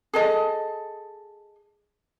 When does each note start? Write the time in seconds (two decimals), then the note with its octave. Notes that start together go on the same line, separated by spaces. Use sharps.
0.13 G#4 A4 D#5